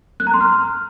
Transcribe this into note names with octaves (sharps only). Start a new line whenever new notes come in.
F#6
A#5
C6
F6